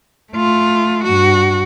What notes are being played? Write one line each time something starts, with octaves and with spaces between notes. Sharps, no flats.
A3 F4
G2 F#4